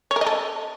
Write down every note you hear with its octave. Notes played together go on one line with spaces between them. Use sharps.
C#5
A#4
D#5
A4